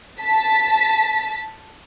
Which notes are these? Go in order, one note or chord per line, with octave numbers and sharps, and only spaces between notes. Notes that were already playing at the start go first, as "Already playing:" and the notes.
A5 B6